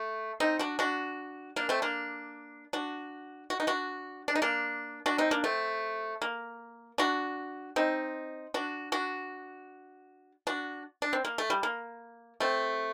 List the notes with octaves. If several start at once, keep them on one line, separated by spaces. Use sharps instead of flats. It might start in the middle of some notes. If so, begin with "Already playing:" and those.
Already playing: A3
C4 D#4
D4 F#4
D4 F#4
A#3 D4
A3 C4
A#3 D4
D4 F#4
F#4
D#4
D4 F#4
D4
D#4
A#3 D4
D4 F#4
C4 D#4
A#3 D4
A3 C4
A#3
D4 F#4
C4 D#4
D4 F#4
D4 F#4
D4 F#4
D4
C4
A#3
A3
G3
A#3
A3 C4